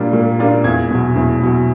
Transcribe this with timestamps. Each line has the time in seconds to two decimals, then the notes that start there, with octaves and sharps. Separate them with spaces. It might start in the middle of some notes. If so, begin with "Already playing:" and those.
Already playing: A#2 G3 A#3 D4 F4
0.13 A#2
0.39 G3 A#3 D4 F4
0.64 E2 G#6
0.90 B2 F#3
1.16 E2
1.41 B2 F#3